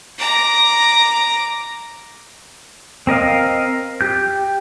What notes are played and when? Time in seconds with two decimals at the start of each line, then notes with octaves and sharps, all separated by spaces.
0.19 A#5 D6
3.07 C4 A#4 D#5 F5
4.01 G4 G6